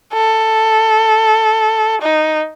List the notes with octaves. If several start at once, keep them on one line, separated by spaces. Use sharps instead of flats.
A4
D#4